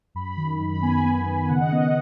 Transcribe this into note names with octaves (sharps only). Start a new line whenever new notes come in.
F#2 B5
D#3
F#2
B5
B3 G#5
B3
D#3
C#3 F#5
D#5
B3 F#5